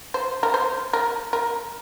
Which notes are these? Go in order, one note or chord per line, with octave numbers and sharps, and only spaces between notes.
C5
A#4
C5
A#4
A#4